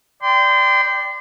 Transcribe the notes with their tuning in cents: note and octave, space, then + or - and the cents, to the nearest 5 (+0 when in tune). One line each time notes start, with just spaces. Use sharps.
D5 +0 G5 +0 C6 -30